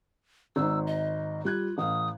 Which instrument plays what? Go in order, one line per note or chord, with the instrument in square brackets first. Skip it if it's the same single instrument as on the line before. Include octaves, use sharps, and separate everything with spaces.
[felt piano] G#1 G#2 [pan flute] E6
[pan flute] D#5
[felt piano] G3 F#6 G#6 [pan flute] F4
[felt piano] A1 F5 [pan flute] D#6